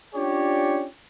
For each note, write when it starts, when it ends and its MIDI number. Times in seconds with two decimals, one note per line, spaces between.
0.15 0.86 61
0.15 0.86 62
0.15 0.86 65
0.15 0.86 67
0.15 0.86 73
0.15 0.86 74